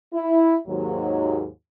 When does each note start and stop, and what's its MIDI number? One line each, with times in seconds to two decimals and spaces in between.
0.14 0.57 64
0.67 1.46 39
0.67 1.46 44
0.67 1.46 54